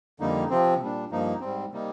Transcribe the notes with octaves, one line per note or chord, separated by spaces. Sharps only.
F2 D3 G3 A#3 D#4
C3 F3 C4
A#2 G3 D4
G2 F3 A#3 D#4
G#2 G3 C4
C3 G3 A#3 D#4